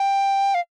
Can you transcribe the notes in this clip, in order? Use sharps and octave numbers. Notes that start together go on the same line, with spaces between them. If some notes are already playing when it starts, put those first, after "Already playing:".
Already playing: G5
F5